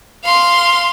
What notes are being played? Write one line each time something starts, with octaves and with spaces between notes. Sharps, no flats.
F5 C6